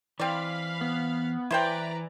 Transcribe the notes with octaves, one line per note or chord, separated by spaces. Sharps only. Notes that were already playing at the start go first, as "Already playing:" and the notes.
E3 C4 D5 F5 B5
B3
E3 E4 B4 C5 D5 G5 A#5